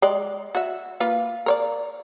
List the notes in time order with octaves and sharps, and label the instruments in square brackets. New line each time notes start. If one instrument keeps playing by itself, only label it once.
[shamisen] G#3 D5 G5
F#4 E5
A#3 F4 B4
A#4 C#5 D5